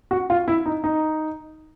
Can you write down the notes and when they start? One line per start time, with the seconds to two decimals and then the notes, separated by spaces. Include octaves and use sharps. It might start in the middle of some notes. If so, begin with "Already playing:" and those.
0.11 F#4
0.30 F4
0.48 E4
0.66 D#4
0.84 D#4